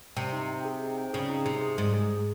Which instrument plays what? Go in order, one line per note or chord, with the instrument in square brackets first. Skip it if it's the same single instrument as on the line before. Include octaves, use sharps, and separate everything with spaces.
[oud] C3 [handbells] G5
[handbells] D#4
G5
G#4
D#4
G5
[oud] C#3 [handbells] G#4
[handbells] D#4
[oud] C3 [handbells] G#4
[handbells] G#4
[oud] G#2 [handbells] G#4
[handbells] G#4
G#4